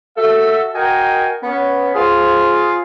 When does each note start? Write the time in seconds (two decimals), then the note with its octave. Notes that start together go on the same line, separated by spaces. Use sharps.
0.17 F#4 A4 E5
0.75 F#4 A#4 D#5 F5 G5 G#5
1.43 B3 C#4
1.95 F4 G#4 C5